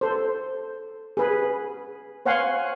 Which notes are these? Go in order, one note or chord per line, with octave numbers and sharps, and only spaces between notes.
A4 C5
G#4 B4
C5 C#5 F5 F#5 G#5 C6